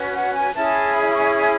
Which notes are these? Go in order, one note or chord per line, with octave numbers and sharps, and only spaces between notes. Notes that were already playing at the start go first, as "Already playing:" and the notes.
Already playing: C#4 F#4 B4
F#5
G#5
C#4 E4 G#4 A5
B5
C#6
C#6